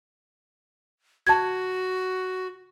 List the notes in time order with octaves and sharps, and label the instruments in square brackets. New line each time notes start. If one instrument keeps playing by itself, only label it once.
[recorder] F#4 [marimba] A5 G#6